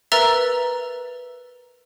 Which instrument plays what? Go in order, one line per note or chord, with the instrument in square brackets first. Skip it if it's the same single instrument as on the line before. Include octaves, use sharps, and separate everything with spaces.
[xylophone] A#4 B4 E5 A#5 E6 A6